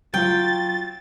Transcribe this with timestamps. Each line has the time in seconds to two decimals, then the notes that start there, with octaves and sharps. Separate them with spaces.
0.14 F#3 F4 G5 A6